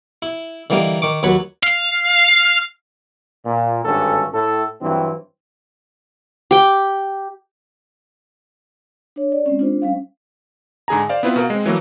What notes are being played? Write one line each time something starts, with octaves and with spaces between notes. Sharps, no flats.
E4
D3 E3 G3 A#3 D#4
D#3 C#6 D6
D#2 F#3 B4 C#5 B5 C#6
F5
A#2
G#1 G2 D3 C#4 A4
A2 A4
G2 E3 F#3 C4
G4 G5
D4 C#5
D5
G#3 C4 C#4
D4 F4 C5
G3 C#4 F5
G#2 D3 G#4 G#5 A#5
C5 D5 F5
B3 C4 E4 F4 B4
B2 A#4 F5
G#3 C4
E3 F#3 A3 A#3